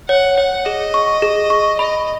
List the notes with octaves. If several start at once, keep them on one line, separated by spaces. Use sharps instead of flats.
C#5 F#5
C#5 F#5
G#4 D#5
C#6
G#4
C#6
D#5 B5